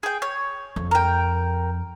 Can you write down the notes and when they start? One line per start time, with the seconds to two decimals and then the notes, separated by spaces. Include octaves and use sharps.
0.03 G#4 G5
0.22 C#5
0.76 F2
0.91 A#4 G5